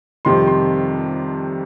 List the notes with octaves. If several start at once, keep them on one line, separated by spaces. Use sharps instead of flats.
F2 C3 D#3 G3 C6
C6